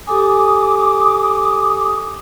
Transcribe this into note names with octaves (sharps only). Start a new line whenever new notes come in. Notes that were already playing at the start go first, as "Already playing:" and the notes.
G4 A4 G#5 D6 D#6